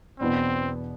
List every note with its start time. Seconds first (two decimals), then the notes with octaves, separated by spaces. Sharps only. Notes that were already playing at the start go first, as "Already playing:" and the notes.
0.20 E2 B2 B3 C4 D4